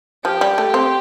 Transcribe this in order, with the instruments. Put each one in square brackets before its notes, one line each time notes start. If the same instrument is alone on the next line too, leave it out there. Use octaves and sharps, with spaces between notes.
[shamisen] F3 [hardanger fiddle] G4
[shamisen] G3
A3
C4